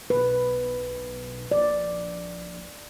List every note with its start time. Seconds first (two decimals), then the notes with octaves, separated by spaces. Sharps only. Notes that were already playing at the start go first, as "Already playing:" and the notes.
0.10 B1 B4
1.51 A#1 D5